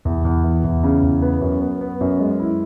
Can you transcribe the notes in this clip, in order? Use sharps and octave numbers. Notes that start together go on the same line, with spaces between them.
E2
E2
E3
E2
C#3
E2
B3
F#2
B3
B3
F#2
G#3
E4